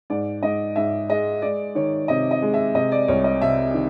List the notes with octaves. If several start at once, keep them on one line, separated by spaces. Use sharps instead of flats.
G#2 D5
G#2 D#5
G#2 E5
G#3 D#5
G#3 D5
D#3 C#5
C3 D#5
D#5
G#3
E5
C3 D#5
D5
C2 C#5
D#5
C3 E5
D#3